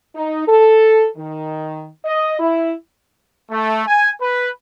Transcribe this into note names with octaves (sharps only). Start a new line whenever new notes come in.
D#4
A4
D#3
D#5
E4
A3
G#5
B4